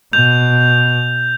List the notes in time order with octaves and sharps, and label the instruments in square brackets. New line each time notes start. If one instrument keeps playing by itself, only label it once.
[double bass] B2 [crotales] G6 F7